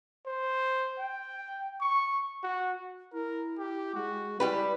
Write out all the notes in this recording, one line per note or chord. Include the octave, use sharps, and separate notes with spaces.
C5
G5
C#6
F#4
E4 A#4
G4
G#3 F#4
G3 G#3 E4 G4 B4